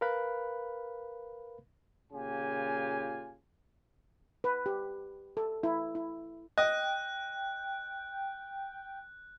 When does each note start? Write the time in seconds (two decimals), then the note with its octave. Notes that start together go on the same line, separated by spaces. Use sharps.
0.01 A#4 B4 F5 B5 F#6
2.13 A#2 C#3 F4 G4 G#5
4.44 B4
4.66 G4
5.37 A4
5.63 E4
5.95 E4
6.58 D#5 G5 F#6